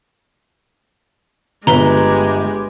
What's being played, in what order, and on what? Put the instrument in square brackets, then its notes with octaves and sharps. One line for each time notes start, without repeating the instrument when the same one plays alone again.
[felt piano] G1 [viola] G#3 G4 [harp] B4 [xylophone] A#5 G7